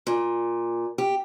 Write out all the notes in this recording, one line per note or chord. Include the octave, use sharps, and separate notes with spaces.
A#2
G4